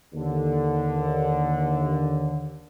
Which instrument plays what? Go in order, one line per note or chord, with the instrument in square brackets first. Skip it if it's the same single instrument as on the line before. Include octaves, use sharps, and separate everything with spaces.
[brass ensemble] D#2 D3